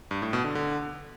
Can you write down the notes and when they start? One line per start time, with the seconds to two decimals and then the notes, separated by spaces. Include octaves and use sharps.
0.11 G2
0.22 A2
0.33 B2
0.44 D3
0.55 D3